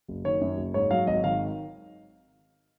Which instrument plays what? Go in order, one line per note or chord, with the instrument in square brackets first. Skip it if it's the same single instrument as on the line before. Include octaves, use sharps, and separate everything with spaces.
[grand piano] F#1
D#3 C#5
F#2
F#1
G#2 C#5
F#3 F5
G#1 D#5
D#3 F5